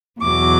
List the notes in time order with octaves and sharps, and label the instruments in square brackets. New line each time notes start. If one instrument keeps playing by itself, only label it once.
[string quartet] E2 B2 F#3 D6